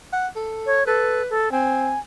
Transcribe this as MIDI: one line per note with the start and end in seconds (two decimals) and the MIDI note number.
0.13 0.27 78
0.36 0.79 69
0.66 0.84 73
0.87 1.22 69
0.87 1.33 71
1.30 1.51 69
1.52 1.94 60
1.52 1.99 80